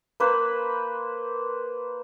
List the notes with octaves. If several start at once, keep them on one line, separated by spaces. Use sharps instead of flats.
A#3 B4 C5